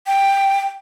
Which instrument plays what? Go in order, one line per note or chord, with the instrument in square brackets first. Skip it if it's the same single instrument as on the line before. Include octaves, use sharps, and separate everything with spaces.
[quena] G5